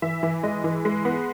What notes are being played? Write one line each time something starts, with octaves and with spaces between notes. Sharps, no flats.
E3 E5
E3
G#3 D#5
E3
G#3
B3